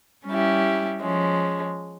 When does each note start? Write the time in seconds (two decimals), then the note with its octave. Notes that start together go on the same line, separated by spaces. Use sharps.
0.26 G3 C#4 E4 G4
1.01 F3 G#3 C#4